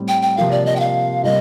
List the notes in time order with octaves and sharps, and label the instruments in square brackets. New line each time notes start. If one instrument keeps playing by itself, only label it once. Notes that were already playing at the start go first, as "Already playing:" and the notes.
Already playing: [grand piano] A2 G3 C4
[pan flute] G5
G5
[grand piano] C3 F3 A#3 F4 [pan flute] F5
[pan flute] D5
D#5
G5
F5
[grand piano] C3 G3 A#3 [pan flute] D#5